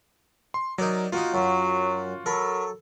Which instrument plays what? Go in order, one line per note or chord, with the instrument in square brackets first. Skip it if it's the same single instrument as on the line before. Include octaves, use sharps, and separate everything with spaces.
[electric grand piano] C6
[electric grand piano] F#3 A#4 [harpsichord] D#4 D5
[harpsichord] A#3 D#4 [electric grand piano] F4 F#4
[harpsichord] F#2 [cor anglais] F#3
[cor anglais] F#3 [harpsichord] A4 [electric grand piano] A#4 B5